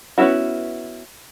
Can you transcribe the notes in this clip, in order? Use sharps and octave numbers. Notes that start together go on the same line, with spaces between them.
B3 C#4 D#4 E4 F#4